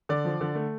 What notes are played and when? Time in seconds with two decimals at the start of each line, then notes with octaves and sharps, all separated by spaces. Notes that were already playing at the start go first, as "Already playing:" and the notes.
0.09 D3 D5
0.25 F3
0.41 D3
0.55 A3